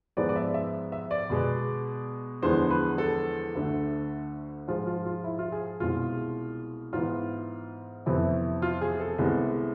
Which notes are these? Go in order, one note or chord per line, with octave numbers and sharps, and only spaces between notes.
G#2 F3 G#3 B3 D5
D5
E5
E5
E5
D5
B2 G#3 B3
E2 D3 F3 G#3 B3 C5
B4
A4
D2 D3 A3
G#2 F3 G#3 F4
F4
F4
E4
F4
G#4
C2 B2 G#3 F4
G#2 E3 B3 F4
F2 C3 E3 B3 E4
F4
G#4
A4
C2 C3 G#3 B3